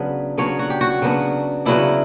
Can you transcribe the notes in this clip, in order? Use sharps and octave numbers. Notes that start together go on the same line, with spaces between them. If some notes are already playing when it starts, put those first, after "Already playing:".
Already playing: C#3 F#3 B3 D4 B4
C#3 F#3 B3 D4 C#5
F#4
G4
F#4
C#3 F#3 B3 D4
C#3 F#3 B3 D4 E4